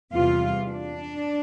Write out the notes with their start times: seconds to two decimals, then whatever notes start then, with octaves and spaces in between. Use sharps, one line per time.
0.12 E2 C3 E3 G3 F4
0.69 D4